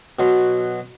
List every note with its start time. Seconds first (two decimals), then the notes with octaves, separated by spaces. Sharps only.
0.19 B2 F#3 C6